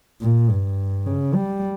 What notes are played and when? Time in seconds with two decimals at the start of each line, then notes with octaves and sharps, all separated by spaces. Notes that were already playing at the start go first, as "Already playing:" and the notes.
0.22 A#2
0.51 G2
1.07 C#3
1.34 G3